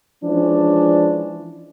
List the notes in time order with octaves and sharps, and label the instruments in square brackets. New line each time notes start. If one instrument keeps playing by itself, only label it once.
[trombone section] E3 F3 G#3 C#4 D4